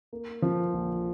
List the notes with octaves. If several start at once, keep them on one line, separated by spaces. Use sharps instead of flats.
A#3
F3
A#1